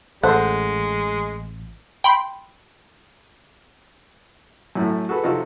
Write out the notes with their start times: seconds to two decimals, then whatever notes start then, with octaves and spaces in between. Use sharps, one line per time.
0.23 A1 G#3 A4 C5 D#5 F#5
2.04 G5 B5 C6
4.75 F#2 A2 A3
5.09 F#4 G#4 A4 B4
5.24 C3 F3 D#4 F4 F#4 A4